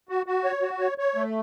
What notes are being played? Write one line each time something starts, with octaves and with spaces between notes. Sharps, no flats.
F#4
F#4
C#5
F#4
C#5
C#5
A3